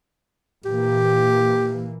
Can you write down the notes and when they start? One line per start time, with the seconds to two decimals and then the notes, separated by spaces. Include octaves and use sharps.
0.65 A#2 E3 A#3 G4